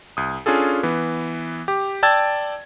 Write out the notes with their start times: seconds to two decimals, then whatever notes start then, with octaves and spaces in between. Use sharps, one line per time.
0.17 C2 D#6
0.46 C#4 D4 F4 G#4 A4
0.83 E3 B3
1.68 G4
2.03 D5 G5 A5 E6 G#6 A6